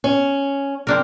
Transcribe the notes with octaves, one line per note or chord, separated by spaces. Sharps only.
C#4
C4 D4 A#4